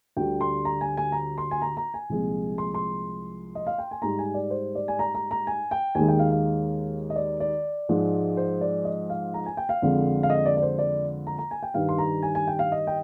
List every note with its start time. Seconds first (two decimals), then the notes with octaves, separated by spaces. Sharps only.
0.16 D2 D3 G3 G5
0.41 C6
0.65 A#5
0.81 G#5
0.97 G#5
1.12 A#5
1.38 C6
1.51 G#5
1.62 A#5
1.77 A#5
1.94 G#5
2.09 C2 A#2 F3 G#3
2.58 C6
2.74 C6
3.55 D#5
3.67 F5
3.78 G5
3.91 G#5
4.02 G#2 G3 A#5
4.19 G#5
4.34 D5
4.51 C5
4.75 D5
4.88 G#5
4.99 A#5
5.15 A#5
5.31 A#5
5.47 G#5
5.71 G5
5.95 D#2 D#3 G#3 G#5
6.08 G5
6.19 F5
6.32 F5
7.10 D#5
7.16 D5
7.40 D5
7.89 G#2 F3 G#3
8.37 C5
8.61 D5
8.85 D#5
9.10 F5
9.34 A#5
9.46 G#5
9.57 G5
9.69 F5
9.82 F2 D3 F3 G#3
10.23 F5
10.30 D#5
10.46 D5
10.57 D5
10.62 C5
10.79 D5
11.27 A#5
11.38 A#5
11.51 G#5
11.63 G5
11.74 G2 D#3 G3 F5
11.89 C6
11.98 A#5
12.23 G#5
12.35 G#5
12.47 G5
12.59 F5
12.72 D#5
12.87 G5